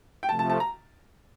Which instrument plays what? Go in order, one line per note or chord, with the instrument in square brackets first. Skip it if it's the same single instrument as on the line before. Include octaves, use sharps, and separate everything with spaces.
[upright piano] G5
[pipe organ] C3 F3 A3 [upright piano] A5
[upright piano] A5
A5
A#5